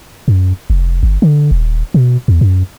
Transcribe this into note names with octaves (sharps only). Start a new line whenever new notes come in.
F#2
F1
G1
D3
D#1
B2
E2
F#2